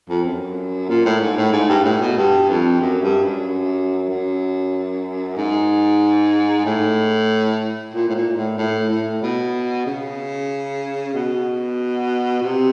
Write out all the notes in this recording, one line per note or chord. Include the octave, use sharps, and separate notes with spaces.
F2
F#2
A#2
A2
G#2
A2
G#2
G2
A2
B2
G2
F2
F#2
G2
F#2
F#2
G#2
A2
A#2
A2
A#2
A2
A2
A2
B2
C#3
B2
C3